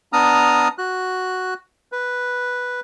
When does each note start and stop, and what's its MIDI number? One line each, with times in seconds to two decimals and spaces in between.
0.13 0.68 59
0.13 0.68 62
0.13 0.68 82
0.13 0.68 87
0.13 0.68 89
0.78 1.54 66
0.78 1.54 90
1.92 2.80 71